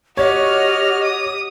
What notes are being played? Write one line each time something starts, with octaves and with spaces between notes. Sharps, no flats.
F#4 G4 C#5 D#5 F6
D#6